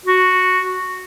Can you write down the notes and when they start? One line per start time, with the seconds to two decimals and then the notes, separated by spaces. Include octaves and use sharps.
0.06 F#4